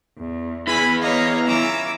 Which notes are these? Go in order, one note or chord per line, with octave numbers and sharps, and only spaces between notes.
E2
B3 E4 G#4 G#5 B5
A#3 C#5 D#5 F5 A#5
E3 C#4 F4 A#5 D6 E6